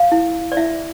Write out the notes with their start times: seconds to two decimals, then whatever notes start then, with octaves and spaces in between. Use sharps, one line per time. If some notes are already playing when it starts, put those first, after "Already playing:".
Already playing: F5
0.12 E4
0.52 D5
0.57 E4 E5